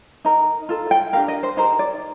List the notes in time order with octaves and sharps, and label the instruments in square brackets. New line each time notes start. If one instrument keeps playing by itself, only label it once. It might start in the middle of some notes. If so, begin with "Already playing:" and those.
[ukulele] D#4 A#4
F4 A4
G5
D4 G4 A#4 F5
D#5
C5
D#4 G4 A#4 C5
D5